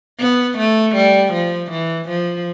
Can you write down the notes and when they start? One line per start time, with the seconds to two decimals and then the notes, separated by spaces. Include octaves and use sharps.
0.20 B3
0.58 A3
0.95 G3
1.33 F3
1.71 E3
2.08 F3